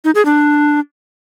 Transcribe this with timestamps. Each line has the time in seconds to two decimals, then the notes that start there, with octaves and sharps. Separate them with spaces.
0.04 D#4
0.15 G#4
0.25 D4